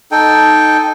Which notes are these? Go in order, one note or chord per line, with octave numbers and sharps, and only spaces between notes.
D#4 A4 G5